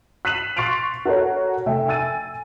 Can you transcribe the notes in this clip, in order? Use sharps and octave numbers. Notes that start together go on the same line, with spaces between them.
F#6 B6 C7 D#7 E7 F#7
C6 C#6 A6 C7 D7 F7
F#4 A4 A#4 C#5
F1 A3 E5 G5
G#5 E6 A6 D#7